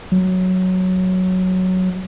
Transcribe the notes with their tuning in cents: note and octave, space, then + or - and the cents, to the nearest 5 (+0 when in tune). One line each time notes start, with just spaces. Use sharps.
F#3 +0